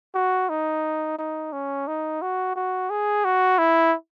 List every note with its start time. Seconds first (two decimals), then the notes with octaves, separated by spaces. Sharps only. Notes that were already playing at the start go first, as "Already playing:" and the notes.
0.15 F#4
0.49 D#4
1.19 D#4
1.53 C#4
1.87 D#4
2.22 F#4
2.56 F#4
2.90 G#4
3.25 F#4
3.58 E4